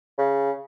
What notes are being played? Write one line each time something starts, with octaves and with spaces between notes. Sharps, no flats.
C#3